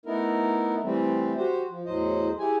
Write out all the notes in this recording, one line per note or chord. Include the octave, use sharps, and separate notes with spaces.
A3 B3 D#4 E4 A#4
E3 G3 A3 C4
F#4 G4 C5
F3
E2 A2 F#3 C5 D#5
E4 G4 G#4 G#5